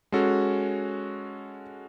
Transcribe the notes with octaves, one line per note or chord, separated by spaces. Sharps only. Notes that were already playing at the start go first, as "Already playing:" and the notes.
G#3 C#4 F#4 A4